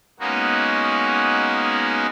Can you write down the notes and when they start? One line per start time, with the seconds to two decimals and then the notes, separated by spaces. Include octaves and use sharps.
0.20 G#3 A#3 B3 C#4 D#4 F#4